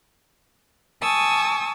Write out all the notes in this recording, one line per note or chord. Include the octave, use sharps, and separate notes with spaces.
G#5 A5 C#6 D#6 E6